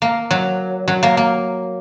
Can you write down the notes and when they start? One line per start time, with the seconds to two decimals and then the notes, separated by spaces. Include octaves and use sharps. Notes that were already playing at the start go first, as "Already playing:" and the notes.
0.02 A#3
0.31 F#3
0.88 F#3
1.03 A#3
1.17 A#3